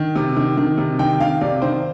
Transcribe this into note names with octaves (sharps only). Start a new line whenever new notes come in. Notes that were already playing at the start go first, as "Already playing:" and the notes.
Already playing: D#3
C3
D#3
D#3
C3
D#3 G5
D#3 F5
C3 D5
D#3 C5